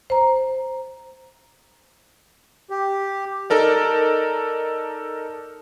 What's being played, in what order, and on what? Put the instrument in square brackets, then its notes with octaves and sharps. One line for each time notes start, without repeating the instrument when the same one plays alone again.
[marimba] C5 A#5
[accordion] G4
[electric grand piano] D#4 A4 A#4 D5